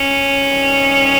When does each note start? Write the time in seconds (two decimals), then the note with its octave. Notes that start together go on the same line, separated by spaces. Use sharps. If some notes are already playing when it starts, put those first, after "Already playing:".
Already playing: C#4
0.44 C3 D#3 G3